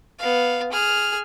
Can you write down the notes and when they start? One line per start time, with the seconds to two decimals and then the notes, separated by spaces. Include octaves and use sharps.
0.19 B3 F5
0.72 G#4 F6